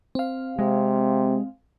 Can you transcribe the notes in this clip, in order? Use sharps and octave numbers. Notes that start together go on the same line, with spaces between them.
C4 F5
C3 G#3